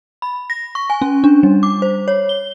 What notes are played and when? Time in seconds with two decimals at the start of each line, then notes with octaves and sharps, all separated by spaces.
0.22 B5
0.50 A#6
0.75 C#6
0.90 G#5
1.02 C#4
1.24 D4
1.43 G3
1.63 D6
1.82 C5
2.08 C#5
2.29 G7